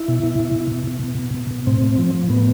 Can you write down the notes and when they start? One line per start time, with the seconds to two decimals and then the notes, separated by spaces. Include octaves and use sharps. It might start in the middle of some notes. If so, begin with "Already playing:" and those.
Already playing: E4
0.08 B2
0.24 B2
0.39 B2
0.55 B2
0.71 B2
0.87 B2
1.03 B2
1.19 B2
1.34 B2
1.51 B2
1.67 A2 C4
1.82 A2
1.98 F3
2.14 F3
2.30 A2 B3